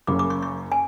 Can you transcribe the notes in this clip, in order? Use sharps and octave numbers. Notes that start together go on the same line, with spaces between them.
F#1 F#2 C#3 D6
D6
C#6
C#6
G#5